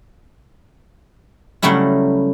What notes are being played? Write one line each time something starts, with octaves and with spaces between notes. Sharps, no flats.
C#3 F#3 G3 A3 E4